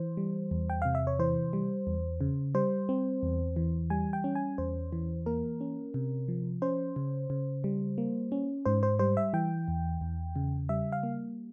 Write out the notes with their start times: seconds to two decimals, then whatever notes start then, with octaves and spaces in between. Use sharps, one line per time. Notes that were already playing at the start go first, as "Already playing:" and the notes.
Already playing: E3 C5
0.17 G3
0.51 E2
0.70 G5
0.82 C3 F5
0.95 E5
1.07 C#5
1.19 E3 C5
1.53 G3
1.87 E2
2.21 C#3
2.55 G3 C5
2.89 C4
3.23 E2
3.56 E3
3.90 G3 G#5
4.13 G5
4.24 C#4
4.35 G#5
4.58 E2 C5
4.93 E3
5.26 A#3 A#4
5.61 C#4
5.94 C3
6.28 F3
6.62 C#4 C5
6.96 C#3
7.30 C#3
7.64 G3
7.98 A#3
8.32 C#4
8.65 G#2 C5
8.83 C5
8.99 G3 C5
9.17 E5
9.33 E3 G5
9.68 E2
10.01 E2
10.36 C#3
10.69 G3 E5
10.92 F5
11.03 A#3